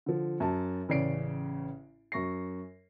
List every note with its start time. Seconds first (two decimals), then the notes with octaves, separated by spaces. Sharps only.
0.06 D3 F3
0.40 F#2 A5
0.89 A1 C#3 D5 C7 D7
2.12 F#2 C#6 A#6 C7